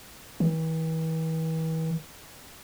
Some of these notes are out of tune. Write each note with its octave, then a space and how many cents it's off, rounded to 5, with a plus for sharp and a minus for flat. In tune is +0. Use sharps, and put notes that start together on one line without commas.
E3 -40